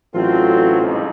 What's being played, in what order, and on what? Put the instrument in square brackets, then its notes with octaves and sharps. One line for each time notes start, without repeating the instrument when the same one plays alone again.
[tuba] A1 [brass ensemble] F#3 C4 A4 [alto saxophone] F4
[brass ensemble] C2 F2 G#2